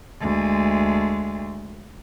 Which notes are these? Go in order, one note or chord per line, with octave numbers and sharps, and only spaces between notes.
D2 G#3